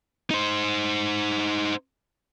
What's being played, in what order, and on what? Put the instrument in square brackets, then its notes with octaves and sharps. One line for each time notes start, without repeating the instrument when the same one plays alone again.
[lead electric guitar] D#4 C5